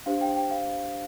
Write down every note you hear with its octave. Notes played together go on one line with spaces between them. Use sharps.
D4 G4 C5 F5
G5
G5
F5